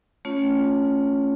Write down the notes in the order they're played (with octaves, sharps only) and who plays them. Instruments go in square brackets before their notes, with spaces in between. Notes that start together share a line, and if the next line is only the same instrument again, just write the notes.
[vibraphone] A3 C#4 F4 C#5